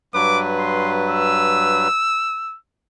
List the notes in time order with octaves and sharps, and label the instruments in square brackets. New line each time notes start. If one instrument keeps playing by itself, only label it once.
[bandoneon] G2 F#3 B4 [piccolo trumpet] D6
[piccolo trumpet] C6
E6